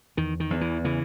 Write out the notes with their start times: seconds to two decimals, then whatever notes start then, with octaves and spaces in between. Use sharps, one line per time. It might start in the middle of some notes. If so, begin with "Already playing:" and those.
0.17 E2 D#3
0.40 D#3
0.50 E2
0.61 E3
0.84 C#3 E3